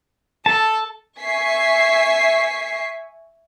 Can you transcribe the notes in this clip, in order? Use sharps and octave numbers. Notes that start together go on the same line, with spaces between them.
A4 A5
E5 G#5 C#6 B6 C7